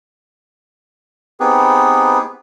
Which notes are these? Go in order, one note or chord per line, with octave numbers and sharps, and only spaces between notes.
B3 C4 D#4 G4 G#4 B4